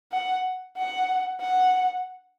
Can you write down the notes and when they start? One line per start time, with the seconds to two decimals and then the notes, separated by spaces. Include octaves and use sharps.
0.12 F#5
0.77 F#5
1.41 F#5